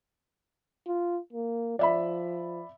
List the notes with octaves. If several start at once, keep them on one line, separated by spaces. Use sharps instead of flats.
F4
A#3
F3 D5 E5 B5